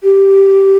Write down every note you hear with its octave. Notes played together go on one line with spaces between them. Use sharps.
G4